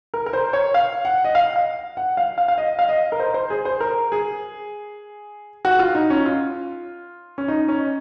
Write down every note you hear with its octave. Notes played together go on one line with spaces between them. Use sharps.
A#4
A#4
C5
C#5
F5
F#5
D#5
F5
F5
F#5
F5
F5
F5
D#5
F5
D#5
A#4
C5
C5
G#4
C5
A#4
G#4
F#4
F4
D#4
C#4
F4
C#4
D#4
C#4